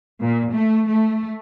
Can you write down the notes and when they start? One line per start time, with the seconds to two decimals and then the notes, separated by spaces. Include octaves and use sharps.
0.21 A#2
0.53 A3
0.89 A3